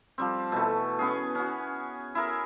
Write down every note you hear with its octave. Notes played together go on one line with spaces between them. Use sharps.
F3 G3 C4
B2 E3 A3
B3 C#4 G#4
C#4 F#4
E4 G#4 A#4